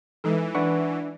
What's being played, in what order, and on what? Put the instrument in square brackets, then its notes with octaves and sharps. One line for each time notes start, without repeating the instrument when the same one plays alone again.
[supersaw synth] E3 [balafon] G#3 D#4 A4
[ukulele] D4 [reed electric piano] B4 F#5 C#6